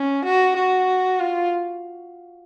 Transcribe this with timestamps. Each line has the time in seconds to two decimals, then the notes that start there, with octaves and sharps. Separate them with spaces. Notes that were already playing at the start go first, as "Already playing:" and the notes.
Already playing: C#4
0.24 F#4
0.56 F#4
1.20 F4